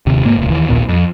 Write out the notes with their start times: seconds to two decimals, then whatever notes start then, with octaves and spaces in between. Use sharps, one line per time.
0.06 D#1 D#2 C3
0.24 G#2 A#3
0.37 D#1 C#2
0.50 D#2 E3
0.69 A#1 D#2 A#2 B3
0.89 F2